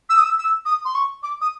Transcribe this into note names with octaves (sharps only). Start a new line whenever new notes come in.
E6
D#6
E6
E6
D#6
C6
C#6
D6
D#6